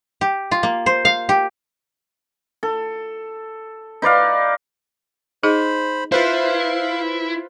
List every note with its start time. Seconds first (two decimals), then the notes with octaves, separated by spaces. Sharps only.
0.21 G4
0.51 F4
0.63 A#3
0.86 C5
1.05 F5
1.29 G4
2.63 A4
4.02 D#4 B4 D5 F5
5.43 D#4 G#4 C5 D#5 B5
6.12 E4 F4 B4 C5 F5